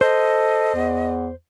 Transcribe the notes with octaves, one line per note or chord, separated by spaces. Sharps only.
A4 C5 D#5
E2